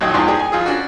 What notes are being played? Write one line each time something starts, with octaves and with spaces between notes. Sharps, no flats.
A#1 D#2 F#3 D#5 G5 D#6
E2 G#2 F3 D5 C6
D#4 G4 G#4
G#5
F2 F4 G#4
C#4 D4 F#4